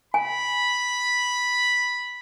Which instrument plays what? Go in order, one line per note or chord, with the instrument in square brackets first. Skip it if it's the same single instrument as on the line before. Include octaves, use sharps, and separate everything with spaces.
[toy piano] G#5 [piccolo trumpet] B5